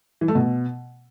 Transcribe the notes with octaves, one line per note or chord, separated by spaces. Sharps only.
E3
A3
B2